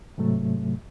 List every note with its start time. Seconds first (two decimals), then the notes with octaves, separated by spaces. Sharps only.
0.18 G#2 C3 F#3 A3